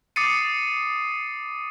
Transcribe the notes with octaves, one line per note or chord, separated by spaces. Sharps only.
D6 D#6 A6 C7 C#7 D#7